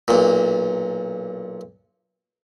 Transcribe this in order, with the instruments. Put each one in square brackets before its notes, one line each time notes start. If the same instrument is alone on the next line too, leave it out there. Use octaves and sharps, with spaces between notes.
[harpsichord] B1 A#2